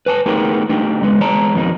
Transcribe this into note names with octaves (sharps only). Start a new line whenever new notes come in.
B4 G#5 A5
A3 B3 D#4 G4 G#4 A#4
A3 D4 D#4 G4
C#2 G#3 B3
E2 G#3 C#5 A5 A#5
F2 B2 D#3 C#4 D#4